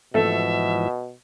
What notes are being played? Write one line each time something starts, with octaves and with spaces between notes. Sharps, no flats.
G#2 B2 E3 F3 A3 A4 E5